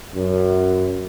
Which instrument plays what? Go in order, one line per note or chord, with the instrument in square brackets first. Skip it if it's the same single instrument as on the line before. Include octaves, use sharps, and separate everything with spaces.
[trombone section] F#2